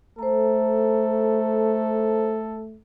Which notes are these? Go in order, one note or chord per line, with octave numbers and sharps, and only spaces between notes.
A3 A4 C5 A#5